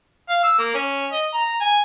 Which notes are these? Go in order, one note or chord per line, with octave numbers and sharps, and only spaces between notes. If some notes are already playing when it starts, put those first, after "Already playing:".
F5
E6
A#3
C#4
D#5
A#5
G#5